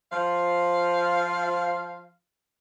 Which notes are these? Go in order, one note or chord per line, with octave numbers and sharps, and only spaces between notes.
F3 F5